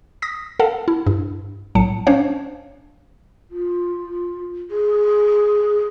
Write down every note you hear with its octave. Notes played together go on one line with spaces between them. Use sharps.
D#6 A#6 B6
A4 A#4 F5 F#5 A5
E4
G2
B1 A2 F#3 A5 C#7
C#4 D4 C5 C#5 F5
F4
G#4